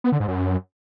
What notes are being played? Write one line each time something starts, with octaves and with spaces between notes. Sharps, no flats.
B3
D3
G#2
F#2